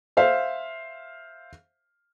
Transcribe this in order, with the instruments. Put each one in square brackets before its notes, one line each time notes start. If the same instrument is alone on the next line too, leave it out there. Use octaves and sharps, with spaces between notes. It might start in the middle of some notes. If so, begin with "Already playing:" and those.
[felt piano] C5 E5 F5